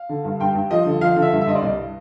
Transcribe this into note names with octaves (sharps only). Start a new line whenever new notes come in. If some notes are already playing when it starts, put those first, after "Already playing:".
Already playing: F5
D3
G2
G2 G5
G2
F3 D#5
D3
F3 F5
D3
E5
G2
E5
G2 D#5
D5
C2 D#5